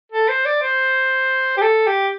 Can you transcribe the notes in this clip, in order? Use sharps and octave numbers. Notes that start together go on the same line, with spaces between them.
A4
C5
D5
C5
G4
A4
G4